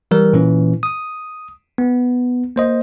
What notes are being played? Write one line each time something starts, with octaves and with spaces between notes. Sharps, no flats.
E3 G3 A#4
A#2 E3 C#4
D#6
B3
A#3 C5 D#5